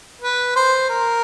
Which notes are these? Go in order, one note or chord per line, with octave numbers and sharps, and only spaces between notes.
B4
C5
A#4